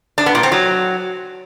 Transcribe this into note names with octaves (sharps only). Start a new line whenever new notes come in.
D4
B3
A#2
C4
F#3